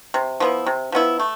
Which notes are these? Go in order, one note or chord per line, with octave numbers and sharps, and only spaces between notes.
C3
F3 B3 E4
C3
F3 B3 E4
A3